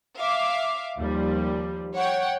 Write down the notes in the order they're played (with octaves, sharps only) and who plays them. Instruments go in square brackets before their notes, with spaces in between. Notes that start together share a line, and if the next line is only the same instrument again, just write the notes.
[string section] E5 F5 D6
D#2 F3 G3
C#5 F#5 G5